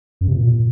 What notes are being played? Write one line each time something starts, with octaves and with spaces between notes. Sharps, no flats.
F#2
C3
A#2